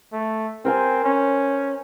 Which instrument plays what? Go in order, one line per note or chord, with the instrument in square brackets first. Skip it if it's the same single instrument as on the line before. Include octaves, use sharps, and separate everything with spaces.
[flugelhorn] A3
[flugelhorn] C4 [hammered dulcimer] A#4 C5 G#5
[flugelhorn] C#4